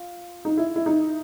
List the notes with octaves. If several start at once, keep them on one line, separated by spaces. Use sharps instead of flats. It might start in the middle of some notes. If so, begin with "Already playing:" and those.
Already playing: F4
D#4
E4
E4
D#4